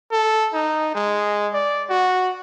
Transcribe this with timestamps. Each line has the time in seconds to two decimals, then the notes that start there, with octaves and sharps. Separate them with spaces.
0.12 A4
0.53 D#4
0.95 G#3
1.54 D5
1.90 F#4